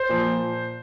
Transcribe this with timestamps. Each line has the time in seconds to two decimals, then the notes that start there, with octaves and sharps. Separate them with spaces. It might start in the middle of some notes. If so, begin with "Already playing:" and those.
Already playing: C5
0.09 A#2 F3